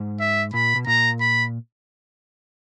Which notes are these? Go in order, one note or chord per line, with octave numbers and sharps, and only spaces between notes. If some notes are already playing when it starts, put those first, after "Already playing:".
Already playing: G#2
E5
A#2 B5
B2
A#2 A#5
B5